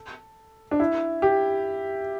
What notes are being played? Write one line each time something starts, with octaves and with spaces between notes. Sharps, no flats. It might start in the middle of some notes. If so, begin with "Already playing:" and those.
Already playing: A4
D4
E4
G4